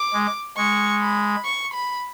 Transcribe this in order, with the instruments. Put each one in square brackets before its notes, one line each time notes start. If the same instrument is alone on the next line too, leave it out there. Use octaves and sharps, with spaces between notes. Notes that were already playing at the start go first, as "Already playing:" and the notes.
Already playing: [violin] D6
[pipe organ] G#3
[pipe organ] G#3 [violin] C#6
[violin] B5
C#6
B5